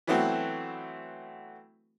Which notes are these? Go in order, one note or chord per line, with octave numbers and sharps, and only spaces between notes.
E3 F#3 A3 B3 C4 F#4